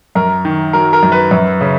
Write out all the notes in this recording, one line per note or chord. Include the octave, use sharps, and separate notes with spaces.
F#2 A#4
D#3
F#3 A#4
A#4
F#2
B4
F#2
C#3